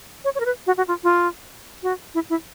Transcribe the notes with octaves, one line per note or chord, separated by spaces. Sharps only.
C#5
C#5
A#4
B4
F#4
F#4
F4
F4
F#4
E4
E4